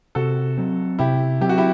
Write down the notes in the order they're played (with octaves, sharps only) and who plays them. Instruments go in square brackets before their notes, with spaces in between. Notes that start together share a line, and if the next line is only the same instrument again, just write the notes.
[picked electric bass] C3 [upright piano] F#4 A4
[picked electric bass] F#3 C4
[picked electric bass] C3 [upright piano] E4 G4
[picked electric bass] F#3 C4 [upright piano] G4
[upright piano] F#4
E4 G4